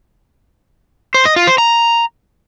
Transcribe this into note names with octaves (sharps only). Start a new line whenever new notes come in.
C5
D#5
F4
C5
A#5